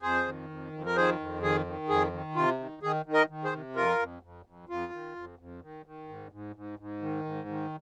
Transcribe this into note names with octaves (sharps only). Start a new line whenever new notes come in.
F2 G#4 C5
D#3
F2
F2
A#4
D#3 G#4 C5
F2
D#3 G#4
D#3
F2 G#4
D#3
C3 F4
D#3
D#3 G#4
D#3
A#4 D#5
D#3
G#4 C5
C3
F2 F4 A#4
F2
F2
F2
F2 F4
D#3
F2
F2
D#3
D#3
G#2
G#2
G#2
G#2
D#3
G#2
D#3